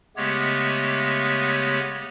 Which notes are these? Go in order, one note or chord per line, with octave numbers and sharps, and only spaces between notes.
C#3 G#3 A3 B3 G4 C#5